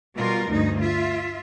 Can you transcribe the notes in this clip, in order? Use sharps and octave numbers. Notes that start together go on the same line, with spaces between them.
B2 G3 F4 A#4
D2 G2 D#4
F4 E5